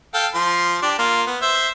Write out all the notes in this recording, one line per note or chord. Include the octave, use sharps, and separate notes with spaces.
A4 F5 G5
F3 C6
D4 G4
A#3 F4
B3
C5 E5